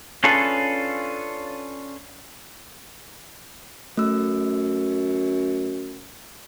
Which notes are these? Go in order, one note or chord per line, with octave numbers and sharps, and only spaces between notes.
C#4 D4 F4 G#4 A4 B4
F#2 A3 E6